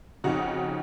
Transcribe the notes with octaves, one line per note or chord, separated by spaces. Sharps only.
F2 C#3 D#4 F#4